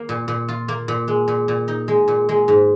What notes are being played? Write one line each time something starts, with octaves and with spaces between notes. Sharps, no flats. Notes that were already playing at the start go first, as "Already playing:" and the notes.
Already playing: A#3
A#2
A#2
F4
A#3
A#2
G#3
A#2
A#2
D#4
G#3
A#2
G#3
G#2